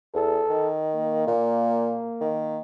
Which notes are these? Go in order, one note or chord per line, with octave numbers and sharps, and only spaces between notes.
E2 A4
D#3
A#3
A#2
D#3